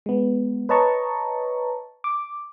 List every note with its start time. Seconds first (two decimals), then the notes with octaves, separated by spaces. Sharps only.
0.06 G#3 B3
0.69 B4 C#5 D#5 A5 A#5 C#6
2.04 D6